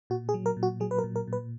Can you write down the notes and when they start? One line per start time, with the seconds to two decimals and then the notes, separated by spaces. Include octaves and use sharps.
0.10 A#2 F#4
0.29 G#4
0.34 F#3
0.46 A#4
0.57 A#2
0.63 F#4
0.80 F#3 G#4
0.91 B4
0.98 A#4
1.04 A#2
1.16 A#4
1.27 A#2
1.33 B4